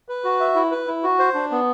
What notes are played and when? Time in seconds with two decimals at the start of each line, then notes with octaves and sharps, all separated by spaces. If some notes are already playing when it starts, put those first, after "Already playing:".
0.09 B4
0.24 F#4
0.40 E5
0.55 E4
0.71 B4
0.87 E4
1.03 F#4
1.19 C5
1.34 D4
1.51 B3